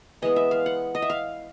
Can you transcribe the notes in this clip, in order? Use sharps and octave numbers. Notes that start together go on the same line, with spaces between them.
E3 G#3 B3 D#5
E5
F5
F#5
D#5
E5
F5